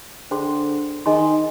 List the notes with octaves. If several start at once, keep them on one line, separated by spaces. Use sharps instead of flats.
D3 G#4 C5 G5 C6
D#3 G#4 D#5 G#5 C6